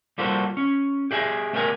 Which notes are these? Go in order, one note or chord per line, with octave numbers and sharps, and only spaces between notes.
G3 A#3 F4 F#4 A4 C5
C#4
G4 G#4 E5 G#5
A3 B3 G4 A#4 G#5